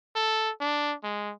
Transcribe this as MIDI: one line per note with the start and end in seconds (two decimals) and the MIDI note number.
0.15 0.51 69
0.60 0.94 62
1.03 1.32 56